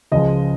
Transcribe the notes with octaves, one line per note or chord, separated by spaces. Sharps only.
C#2 C#3 F3 G#3 D#5